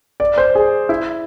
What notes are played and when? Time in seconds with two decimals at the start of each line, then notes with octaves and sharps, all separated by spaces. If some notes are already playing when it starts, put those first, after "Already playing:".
0.20 D5
0.38 C5
0.55 G#4
0.89 E4